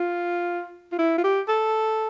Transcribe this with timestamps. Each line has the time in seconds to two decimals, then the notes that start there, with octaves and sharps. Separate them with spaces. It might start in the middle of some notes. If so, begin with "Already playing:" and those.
Already playing: F4
0.92 F4
0.99 E4
1.18 F4
1.24 G4
1.48 A4